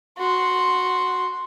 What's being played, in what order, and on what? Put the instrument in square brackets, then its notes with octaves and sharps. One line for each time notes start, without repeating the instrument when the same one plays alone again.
[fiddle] F#4 C6